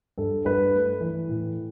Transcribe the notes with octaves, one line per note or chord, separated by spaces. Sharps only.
G2 A4
G2 B4
A3
E3
A2